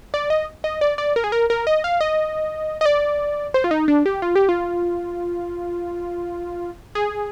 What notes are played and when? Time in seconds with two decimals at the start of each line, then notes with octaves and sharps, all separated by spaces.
0.14 D5
0.30 D#5
0.64 D#5
0.81 D5
0.98 D5
1.16 A#4
1.24 G#4
1.32 A#4
1.50 A#4
1.67 D#5
1.84 F5
2.01 D#5
2.81 D#5
2.86 D5
3.54 C5
3.64 F4
3.71 D#4
3.88 D4
4.06 G4
4.22 F4
4.36 G4
4.49 F4
6.95 G#4